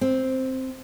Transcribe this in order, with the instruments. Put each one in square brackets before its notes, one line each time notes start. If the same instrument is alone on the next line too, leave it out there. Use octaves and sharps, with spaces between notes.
[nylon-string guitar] C4